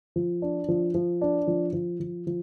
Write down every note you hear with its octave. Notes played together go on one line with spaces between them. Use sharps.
F3
D4
F3
F3
D4
F3
F3
F3
F3